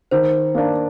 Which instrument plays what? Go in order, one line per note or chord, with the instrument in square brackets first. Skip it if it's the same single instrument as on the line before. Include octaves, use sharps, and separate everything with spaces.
[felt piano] D#3 [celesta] C5
[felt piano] A#3 D4